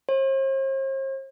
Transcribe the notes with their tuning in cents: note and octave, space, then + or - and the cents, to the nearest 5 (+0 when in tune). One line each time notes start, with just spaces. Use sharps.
C5 +45